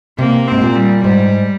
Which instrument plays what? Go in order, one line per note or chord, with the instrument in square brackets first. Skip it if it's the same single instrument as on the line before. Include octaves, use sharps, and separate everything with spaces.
[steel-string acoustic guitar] C3 [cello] A#3
[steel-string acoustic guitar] G#2 [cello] C4
[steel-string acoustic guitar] A#2
[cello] G3
[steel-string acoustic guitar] G#2 [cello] G3